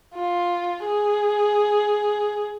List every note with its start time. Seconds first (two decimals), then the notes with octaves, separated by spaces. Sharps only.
0.14 F4
0.84 G#4